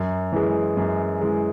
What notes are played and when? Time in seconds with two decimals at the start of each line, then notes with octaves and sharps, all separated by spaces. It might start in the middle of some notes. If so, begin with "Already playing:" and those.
Already playing: F#2
0.32 E3 G#3
0.77 F#2
1.21 E3 G#3